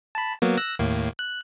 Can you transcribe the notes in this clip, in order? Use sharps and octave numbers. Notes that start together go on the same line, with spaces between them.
A5 B5
F#3 A#3 B3
E6 F#6 A#6
D#2 A2 A#3
F#6